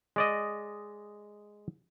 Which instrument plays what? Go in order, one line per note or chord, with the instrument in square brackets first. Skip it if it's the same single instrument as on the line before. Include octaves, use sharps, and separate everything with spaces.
[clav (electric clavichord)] G#3 D5 D#5